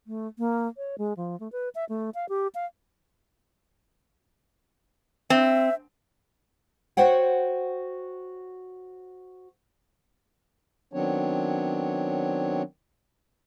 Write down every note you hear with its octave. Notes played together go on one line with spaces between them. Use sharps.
A3
A#3
C#5
G#3
F3
A3
B4
E5
A3
F5
G4
F5
C4 E5
F#4 C5 C#5 F#5 G5
D#3 F#3 B3 C4 D4 C#5